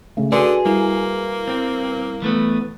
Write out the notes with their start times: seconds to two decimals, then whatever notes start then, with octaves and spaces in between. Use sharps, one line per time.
0.17 C#3 A3
0.32 D3 F#4 G#4 B4 C6
0.65 G3 A#3 E4
1.48 C4
2.22 E3 A3 B3